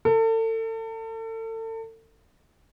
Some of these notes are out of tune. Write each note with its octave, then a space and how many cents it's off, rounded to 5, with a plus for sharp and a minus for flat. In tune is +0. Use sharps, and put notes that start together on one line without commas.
A4 +35